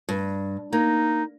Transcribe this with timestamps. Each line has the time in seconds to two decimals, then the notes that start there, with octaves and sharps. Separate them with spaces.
0.09 G2
0.73 A#3 D#4